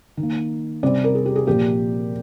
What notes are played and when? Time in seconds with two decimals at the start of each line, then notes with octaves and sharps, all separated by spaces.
0.17 D#3
0.23 A#3
0.83 C3 G3 C4 D5
1.04 A#4
1.15 G#4
1.26 G4
1.36 G#4
1.46 A#2 F3 A#3 G4